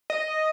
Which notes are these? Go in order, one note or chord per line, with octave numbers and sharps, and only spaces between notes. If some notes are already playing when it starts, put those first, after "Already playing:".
D#5